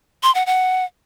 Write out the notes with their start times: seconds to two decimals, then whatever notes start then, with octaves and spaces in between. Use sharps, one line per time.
0.23 C6
0.35 F#5
0.46 F#5